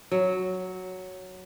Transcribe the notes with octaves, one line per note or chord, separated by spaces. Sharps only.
F#3